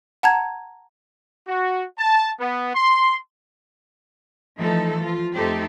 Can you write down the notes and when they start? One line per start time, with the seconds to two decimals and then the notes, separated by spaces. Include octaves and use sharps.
0.23 F#5 A5 A#5 G#6
1.48 F#4
1.99 A5
2.40 B3
2.75 C6
4.57 E3 F3 A3 D#4 A4
5.01 F3 F4
5.33 F2 A3 D#4 G4 A4 C5